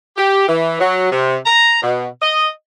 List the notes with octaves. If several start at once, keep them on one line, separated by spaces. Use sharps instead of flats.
G4
E3
F#3
C3
A#5
B2
D#5